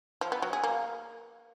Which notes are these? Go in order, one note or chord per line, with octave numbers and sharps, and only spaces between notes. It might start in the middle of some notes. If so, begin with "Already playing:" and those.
F3
B3
F#3
G#4
A#3